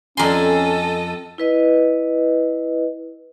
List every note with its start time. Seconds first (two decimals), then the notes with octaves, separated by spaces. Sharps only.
0.17 F2 C#4 A4 D#5 G#5 A#5 C6
1.38 E4 B4 D#5